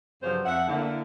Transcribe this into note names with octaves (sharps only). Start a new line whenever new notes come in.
G2 C#3 F3 F#3 C5 C#5
F2 F3 E5 F#5
D3 A#3 E4